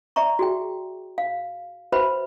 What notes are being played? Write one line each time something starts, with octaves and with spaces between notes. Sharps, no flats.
D5 E5 A#5 C#6
F#4 G#4 G5
F5
F#4 B4 C5 E5 F#5 B5